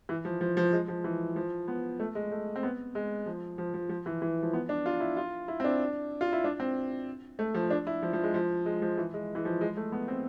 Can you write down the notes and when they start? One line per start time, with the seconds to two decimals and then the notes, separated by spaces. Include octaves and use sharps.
0.09 E3
0.25 F3
0.41 F3
0.57 F3
0.73 G#3
0.88 F3
1.04 E3
1.36 F3
1.68 B3
2.00 A3
2.15 G#3
2.31 A3
2.56 C4
2.63 B3
2.95 G#3
3.26 F3
3.58 F3
3.74 F3
3.89 F3
4.06 E3
4.22 E3
4.43 F3
4.53 B3
4.69 D4
4.86 F4
5.00 E4
5.17 F4
5.48 E4
5.60 C4
5.64 D4
6.21 F4
6.33 E4
6.44 D4
6.60 C4
7.39 A3
7.54 F3
7.70 D4
7.87 E4
8.03 F3
8.13 F3
8.23 G#3
8.34 F3
8.66 G#3
8.82 F3
8.98 E3
9.14 G#3
9.35 E3
9.45 F3
9.61 G#3
9.77 A3
9.92 B3
10.08 C4